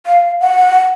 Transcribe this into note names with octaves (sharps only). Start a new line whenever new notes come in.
F5
F#5